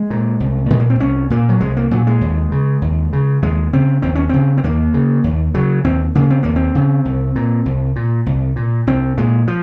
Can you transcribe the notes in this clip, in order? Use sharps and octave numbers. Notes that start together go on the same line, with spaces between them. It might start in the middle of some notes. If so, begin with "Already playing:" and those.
Already playing: G#3
A#2
C2
A#2 G#3
A#3
C4
C2 C#4
A#2 A#3
F#3
C2 G#3
A#3
A#2 F#3
G#3
D#2
C#3
D#2
C#3
D#2 G#3
C#3 C4
D#2 C4
C#4
C#3 C4
C4
D#2 A#3
C#3
D#2
C#3 F#3
D#2 C4
C#3 A#3
C4
D#2 A#3
C4
C#3
C2
A#2
C2
A#2
C2
A#2
C2 C4
A#2 G#3
F3